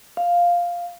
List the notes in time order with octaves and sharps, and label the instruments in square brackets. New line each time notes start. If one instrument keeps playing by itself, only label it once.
[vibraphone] F5